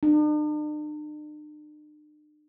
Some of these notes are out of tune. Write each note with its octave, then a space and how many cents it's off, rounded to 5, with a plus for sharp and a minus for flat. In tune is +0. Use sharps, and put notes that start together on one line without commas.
D4 +45